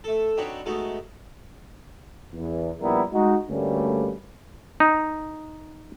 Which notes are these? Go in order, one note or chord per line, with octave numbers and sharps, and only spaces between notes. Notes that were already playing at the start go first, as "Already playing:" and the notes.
A3 A4
C4 D4 D#4 F#4 B4 C#5
G#3 A3 B3 D#4 F#4
E2
A#1 G3 B3 E4 A#4 A#5
G#3 D#4 F#4
D2 G2 G3 A3 A#3 C#4
D#4